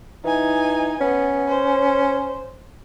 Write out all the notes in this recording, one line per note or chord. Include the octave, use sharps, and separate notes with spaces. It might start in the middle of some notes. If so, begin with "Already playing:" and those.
E3 D#4 G#5
B3 C#4
C5